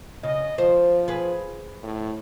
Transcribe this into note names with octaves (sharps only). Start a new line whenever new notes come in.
C#3 D#5
F3 C5
G#4 B4
A2